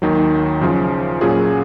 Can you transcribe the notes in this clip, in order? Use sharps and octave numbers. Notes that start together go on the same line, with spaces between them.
D#2 D#3 F#3
F#2 C#3 F3
A#2 F#3 C#4 F4 G#4